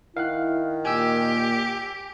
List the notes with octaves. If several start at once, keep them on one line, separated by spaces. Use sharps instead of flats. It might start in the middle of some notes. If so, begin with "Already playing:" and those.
D#3 E4 F5 F#5 F#6
A#2 G4 G#5 E6